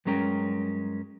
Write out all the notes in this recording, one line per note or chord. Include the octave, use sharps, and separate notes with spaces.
G2 F#3 G#3 C#4 A#4 G5